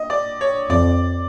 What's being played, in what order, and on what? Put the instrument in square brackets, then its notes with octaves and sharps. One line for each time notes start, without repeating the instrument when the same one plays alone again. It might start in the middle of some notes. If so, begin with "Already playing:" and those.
Already playing: [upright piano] D#5
D5
C#5
[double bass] F2 [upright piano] D5